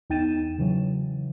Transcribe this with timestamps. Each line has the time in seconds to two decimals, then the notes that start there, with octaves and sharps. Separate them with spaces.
0.10 E2 D#4 G5 A6 D#7 E7
0.58 C#3 E3 F#3